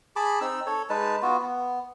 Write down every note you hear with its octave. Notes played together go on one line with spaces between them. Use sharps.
G#4 A5 B5 D6
C4 D#4 E6
A4 C#5
G#3 D#4 B4 A5
B3 F4 F#4
B3